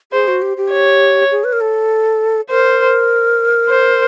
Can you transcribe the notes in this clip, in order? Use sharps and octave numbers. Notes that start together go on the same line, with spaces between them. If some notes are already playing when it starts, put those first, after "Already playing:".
G#4 C5
F#4
G4
G4
C#5
G#4
B4
A#4
A4
A#4 C5
C5